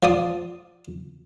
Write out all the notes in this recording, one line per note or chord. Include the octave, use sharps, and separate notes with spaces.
F3 D5 D#6